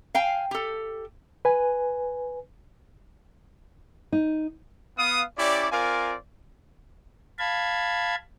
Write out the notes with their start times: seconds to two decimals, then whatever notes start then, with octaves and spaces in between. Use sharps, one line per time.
0.15 F5 G5 G#5
0.51 G4 A4
1.45 B4 G#5
4.12 D#4
4.98 B3 F5 D#6
5.37 C#4 E4 G4 D5
5.71 C4 F4 A#4 D5 F5 G#5
7.39 F5 A5 B5 G#6